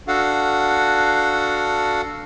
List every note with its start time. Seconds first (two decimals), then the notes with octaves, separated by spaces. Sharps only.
0.08 D4 F#4 A4 F5 F#5